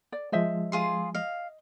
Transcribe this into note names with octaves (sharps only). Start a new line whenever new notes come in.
D5
F3 G#3 C5 D#5 E5
F4 G#4 C6
D#5 F5